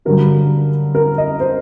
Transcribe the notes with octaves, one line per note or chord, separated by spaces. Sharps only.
G2 D3 F#3 A#4
A#4
D#5
C5